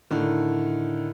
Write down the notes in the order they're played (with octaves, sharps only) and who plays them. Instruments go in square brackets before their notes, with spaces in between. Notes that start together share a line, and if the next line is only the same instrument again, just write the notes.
[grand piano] A2 D3 D#3